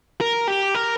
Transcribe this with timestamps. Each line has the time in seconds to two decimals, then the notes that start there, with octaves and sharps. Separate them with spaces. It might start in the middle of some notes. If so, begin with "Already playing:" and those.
0.21 A#4
0.48 G4
0.75 A#4